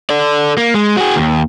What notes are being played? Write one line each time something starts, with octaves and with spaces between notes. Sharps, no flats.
A4 D5
A#3
G#3
F#4 G#4
D#2